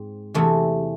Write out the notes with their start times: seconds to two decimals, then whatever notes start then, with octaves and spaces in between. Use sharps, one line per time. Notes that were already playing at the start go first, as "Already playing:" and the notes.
Already playing: G#2 C4
0.34 E2 C3 E3 A3